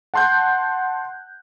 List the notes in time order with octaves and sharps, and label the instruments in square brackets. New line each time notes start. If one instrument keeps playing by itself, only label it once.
[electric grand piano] F#5 A5 C6 F#6 G6